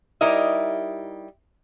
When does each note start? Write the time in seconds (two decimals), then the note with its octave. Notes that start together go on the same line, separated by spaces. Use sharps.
0.21 G3 D#4 E4 A#4 D#5 E5